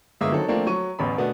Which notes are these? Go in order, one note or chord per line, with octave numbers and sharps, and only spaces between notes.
G1 G#3 A#3 E5 D6 D#6
D#3 F#3 C4 A4
F3 A3 A#3 C4 D4
F#3 C#6 D#7
A1 E2 B5
B2 A3 B3 D4